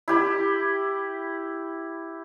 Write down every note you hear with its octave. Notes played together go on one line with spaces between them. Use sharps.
E4 G4 B5